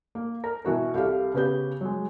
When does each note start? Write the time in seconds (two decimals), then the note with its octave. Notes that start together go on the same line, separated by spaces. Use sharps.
0.15 A#3
0.44 A#4
0.65 B2 E3 F#4 A#4
0.94 C2 G4 A4 F5
1.34 C#3 B3 G4 B4 G6
1.81 F#3 G#3